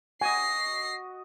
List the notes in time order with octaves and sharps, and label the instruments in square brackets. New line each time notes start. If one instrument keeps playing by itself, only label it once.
[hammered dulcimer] F#4 D#5 [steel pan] G#5 [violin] A#6 C7